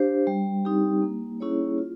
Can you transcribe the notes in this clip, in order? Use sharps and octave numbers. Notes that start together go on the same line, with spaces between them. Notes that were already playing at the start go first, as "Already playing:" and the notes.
Already playing: D4 G4 C5 F5
G3
C4 D#4 G4
A#3
C#4 E4 G#4 C#5
F4